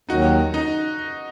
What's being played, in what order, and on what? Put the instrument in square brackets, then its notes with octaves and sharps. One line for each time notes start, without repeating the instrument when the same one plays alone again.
[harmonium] D#2 D#3 F#3 [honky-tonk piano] D#4 F#4
[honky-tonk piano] D#4